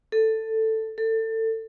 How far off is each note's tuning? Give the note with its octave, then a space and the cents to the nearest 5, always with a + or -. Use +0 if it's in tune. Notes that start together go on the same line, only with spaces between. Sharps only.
A4 +10
A4 +25